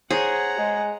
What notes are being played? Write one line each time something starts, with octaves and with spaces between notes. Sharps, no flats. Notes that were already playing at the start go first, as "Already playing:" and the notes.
G#4 C5 C#5 F#5 A#5
G#3